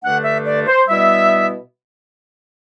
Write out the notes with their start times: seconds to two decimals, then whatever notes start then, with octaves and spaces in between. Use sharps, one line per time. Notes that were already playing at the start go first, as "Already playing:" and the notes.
0.02 G2 D3 A3 D4 F#5
0.24 E5
0.45 D5
0.66 C5
0.87 B2 G3 B3 E4 E5